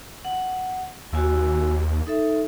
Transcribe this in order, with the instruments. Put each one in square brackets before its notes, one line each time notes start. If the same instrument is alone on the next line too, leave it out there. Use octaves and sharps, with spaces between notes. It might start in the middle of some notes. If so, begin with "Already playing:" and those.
[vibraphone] F#5
[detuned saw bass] D#2 [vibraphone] F#4 G#5 E6
[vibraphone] D#4 A4 E5